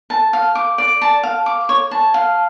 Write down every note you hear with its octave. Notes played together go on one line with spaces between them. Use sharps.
A5
F5
D6
D5
A5
F5
D6
C#5
A5
F5